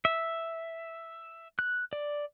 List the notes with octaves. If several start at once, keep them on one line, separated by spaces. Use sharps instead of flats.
E5
F#6
D5